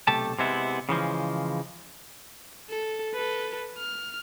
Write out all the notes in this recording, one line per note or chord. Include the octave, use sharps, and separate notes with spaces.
B1 C3 A3 G4 A4 A5
C3 G#3 B3 E4
C#3 E3 F3 G#3
A4
A4 B4
F6